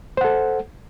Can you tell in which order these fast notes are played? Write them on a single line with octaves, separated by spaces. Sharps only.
C5 F#5 A4